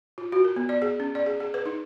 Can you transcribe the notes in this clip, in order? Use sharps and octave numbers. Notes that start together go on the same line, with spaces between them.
F4
F#4
A#4
B3
D5
G#4
C#4
D5
G#4
G#4
B4
D#4